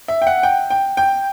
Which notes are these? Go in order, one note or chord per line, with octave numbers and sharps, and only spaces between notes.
E5
G5
F#5
G5
G5
G5